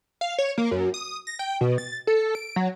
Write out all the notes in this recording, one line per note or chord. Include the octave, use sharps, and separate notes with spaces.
F5
C#5
A#3
F#2
D#6
A#6
G5
B2
A6
A4
D7
F#3